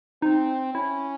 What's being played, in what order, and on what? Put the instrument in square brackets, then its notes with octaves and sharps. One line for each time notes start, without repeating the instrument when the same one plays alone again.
[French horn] C4 [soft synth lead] D#4
[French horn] C#4 [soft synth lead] E4